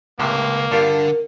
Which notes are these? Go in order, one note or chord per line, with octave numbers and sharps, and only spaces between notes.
C#2 A2 C3 A#3
G2 D3 F4 G4 A#4